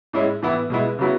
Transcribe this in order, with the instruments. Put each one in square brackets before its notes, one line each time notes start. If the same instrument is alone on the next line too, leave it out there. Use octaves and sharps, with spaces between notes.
[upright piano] A2 G#3 C#4 E4
A2 E3 B3 E4
B2 G#3 B3 E4
C#3 F#3 B3 E4